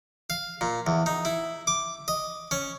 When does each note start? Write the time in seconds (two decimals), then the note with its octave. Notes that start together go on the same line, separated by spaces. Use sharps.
0.30 F5
0.61 A#2
0.87 E2
1.06 D#4
1.25 E4
1.67 D6
2.08 D#5
2.51 C#4